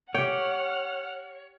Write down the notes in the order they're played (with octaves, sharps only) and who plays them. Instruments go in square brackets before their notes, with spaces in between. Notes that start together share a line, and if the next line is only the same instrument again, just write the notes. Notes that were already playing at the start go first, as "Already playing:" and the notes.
[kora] G4 G5 [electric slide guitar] C#5 [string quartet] F#5 F6